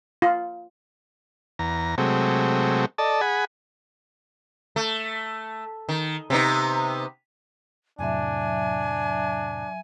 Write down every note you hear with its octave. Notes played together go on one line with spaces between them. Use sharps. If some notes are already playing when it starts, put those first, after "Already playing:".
F4
E2 A#5
C3 F#3 G#3 A3 C4
A4 D5 D#5 A5
G#4 F#5 G#5 B5
A3
D#3
C3 B3 D#4
F2 A2 C3 F#3 D4 E5 G#5